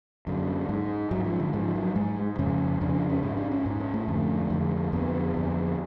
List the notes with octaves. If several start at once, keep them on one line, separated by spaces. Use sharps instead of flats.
F#2 D3
G#2
G#2 F#3
F3
D3
G#2 F3
F#3
G#2 G#3
F2 C#3 C#4
F2 C#3 D4
D4
C#4
G#2 C#4
D4
C#4
G#2
C#4
A3
F2 D3
F2 D3
F2 D3 B3
F2 D3